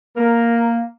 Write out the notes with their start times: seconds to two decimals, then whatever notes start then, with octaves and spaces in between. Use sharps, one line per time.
0.16 A#3 A#4